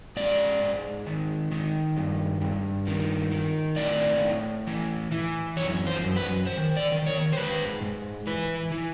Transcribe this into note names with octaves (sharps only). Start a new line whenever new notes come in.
G#2 D5
G#2
D#3
D#3
G2
G2
D#3
D#3
A2 D5
A2
E3
E3
F#2 C#5
C5
F#2
B4
D#3 C5
D5
D#3
C#5
C5
G#2 B4
G#2
E3 B4
E3